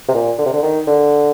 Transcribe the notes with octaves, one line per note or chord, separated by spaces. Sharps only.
C3
A#2
D3
C3
D3
D#3
D3